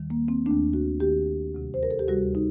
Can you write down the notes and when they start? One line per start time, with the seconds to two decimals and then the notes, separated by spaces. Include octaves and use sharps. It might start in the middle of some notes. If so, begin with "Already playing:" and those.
Already playing: D#2 D#3 G3
0.10 A#3
0.28 C4
0.46 D#2 D#3 A3 D4
0.73 F#4
1.00 D#2 D#3 A3 G4
1.55 D2 C3 G3
1.74 C5
1.83 A#4
1.91 A4
1.99 G4
2.08 D2 C3 G3 F#4
2.35 D#4